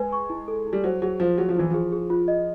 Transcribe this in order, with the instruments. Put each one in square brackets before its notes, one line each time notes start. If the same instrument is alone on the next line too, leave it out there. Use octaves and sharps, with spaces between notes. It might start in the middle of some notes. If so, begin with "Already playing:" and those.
Already playing: [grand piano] G#3 [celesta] B4 G#5
[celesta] C#6
E4
A4
E4
[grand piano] G3
[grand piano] F#3 [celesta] C5
[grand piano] F#3 [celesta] G#4
[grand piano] F3 [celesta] C5
[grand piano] F#3 [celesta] G#4
[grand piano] F3
[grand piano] E3 [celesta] E4
[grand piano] F3 [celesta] G#4
[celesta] G#4
F4
D#5